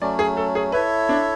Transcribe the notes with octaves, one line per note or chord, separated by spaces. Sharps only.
F#3 A3 C#4 D5
G#4
A4
G#4
E4 A4 B4 C#5 E5
D4